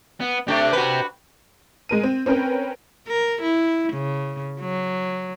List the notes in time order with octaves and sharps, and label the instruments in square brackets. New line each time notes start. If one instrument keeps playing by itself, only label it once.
[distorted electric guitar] B3
[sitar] A3 D4 [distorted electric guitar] G4 C5
[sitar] F#4 B4
[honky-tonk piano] G#3 A#4 D#7
C4
C4 C#4 A#4 B4 G5
[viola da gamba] A#4
E4
C#3
F#3